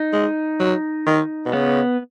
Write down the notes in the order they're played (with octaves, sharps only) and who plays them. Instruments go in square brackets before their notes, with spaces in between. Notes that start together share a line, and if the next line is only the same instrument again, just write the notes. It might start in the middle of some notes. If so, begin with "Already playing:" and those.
Already playing: [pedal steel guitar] D#4
[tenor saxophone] G#3
F#3
D#3
B2
[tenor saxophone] C#3 [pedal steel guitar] B3